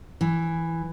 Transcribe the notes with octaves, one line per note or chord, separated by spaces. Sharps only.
E3